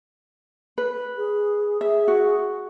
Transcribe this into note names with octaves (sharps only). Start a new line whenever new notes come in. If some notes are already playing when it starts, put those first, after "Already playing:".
B4
G#4
G#4 E5
F#4